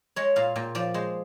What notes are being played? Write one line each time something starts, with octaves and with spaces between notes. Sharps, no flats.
G#3 C#5
A#2 F5
A#2 G5
F3 D5
G#3 C5